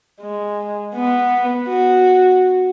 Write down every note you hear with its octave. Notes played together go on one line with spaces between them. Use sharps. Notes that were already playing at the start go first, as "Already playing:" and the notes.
G#3
B3
F#4